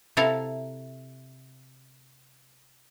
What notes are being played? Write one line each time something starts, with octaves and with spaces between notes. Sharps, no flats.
C3 E4 A4 F5 A#5